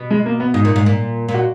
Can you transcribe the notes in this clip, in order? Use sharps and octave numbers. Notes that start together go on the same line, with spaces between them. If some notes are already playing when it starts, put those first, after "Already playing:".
Already playing: B2
G#3
A#3
B3
G#2 D#4
A#2
G#2
A#2
A#2
F#4